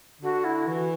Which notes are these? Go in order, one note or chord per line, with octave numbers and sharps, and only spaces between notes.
D3 F#4
E4
E3 F#4